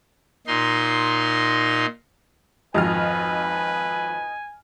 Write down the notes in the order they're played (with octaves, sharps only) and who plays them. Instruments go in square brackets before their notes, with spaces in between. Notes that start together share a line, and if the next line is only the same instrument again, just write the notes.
[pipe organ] A#2 D#4 C6
[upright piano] G#1 F2 [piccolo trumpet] B4 [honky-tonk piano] D#5 F6 [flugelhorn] G#5